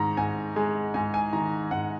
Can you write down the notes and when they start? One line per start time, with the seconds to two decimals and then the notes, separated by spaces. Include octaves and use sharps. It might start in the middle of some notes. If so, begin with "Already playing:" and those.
Already playing: G#2 D#3 A#5
0.17 G#2 G#5
0.56 G#3 G#5
0.94 G#2 G#5
1.14 G#5
1.33 D#3 A#5
1.71 G#2 F#5